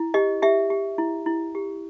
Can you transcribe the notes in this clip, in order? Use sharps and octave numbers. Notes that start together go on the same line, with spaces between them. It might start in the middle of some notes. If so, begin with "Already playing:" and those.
Already playing: E4
G4 D#5
G4 E5
G4
E4
E4
G4